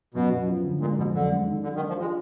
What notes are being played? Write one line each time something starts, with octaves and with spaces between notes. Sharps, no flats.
F#2 B2
F#2
F3
D3
A#2 G#3
F2 B2
F#2 D3
G#3
D#3
D3 F#3
D#3
D4
F3
G#3 F4